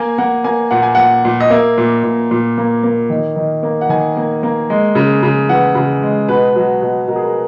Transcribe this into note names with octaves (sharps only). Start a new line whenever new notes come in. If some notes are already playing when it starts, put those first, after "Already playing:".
Already playing: A#3 G#5
A#3 F#5
A#3 G#5
A#2 F#5
G#5
A#2 F#5
A#2
D#5
A#3 E5
A#2
A#2
A#2
A#3
A#3
D#3
D#3
A#3
F#5
D#3 G#5
A#3
A#3
G#3
C#3
C#3
E3 F#5
C#3
G#3
B2 B4
F#3
B2
B2 A#4
G#4
A#4